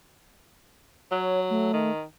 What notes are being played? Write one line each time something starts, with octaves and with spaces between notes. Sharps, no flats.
F#3 C#5
A3
D#3